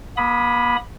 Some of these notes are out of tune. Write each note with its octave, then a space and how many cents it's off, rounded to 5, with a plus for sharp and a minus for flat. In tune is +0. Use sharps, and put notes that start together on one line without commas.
A#3 +45 B5 +0 D#6 +10